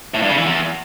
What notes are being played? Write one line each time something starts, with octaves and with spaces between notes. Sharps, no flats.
A2
G2
C#3
E3
E2